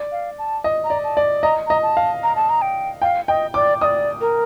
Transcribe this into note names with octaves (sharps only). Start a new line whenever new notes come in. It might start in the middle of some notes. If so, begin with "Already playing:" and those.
Already playing: D5
F5
A5
D#5
A#5
D5
A5
D5
D#5 A#5
D#5 A#5
A5
F5
A#5
A5
A#5
G5
F5 G5
D#5 G5
D5 D6
D#5 D#6
D5
A#4